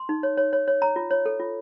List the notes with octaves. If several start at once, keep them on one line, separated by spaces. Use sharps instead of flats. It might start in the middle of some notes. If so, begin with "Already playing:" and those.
Already playing: C6
D#4
C#5
C#5
C#5
C#5
C#5 A#5
F4
C#5
A4
F4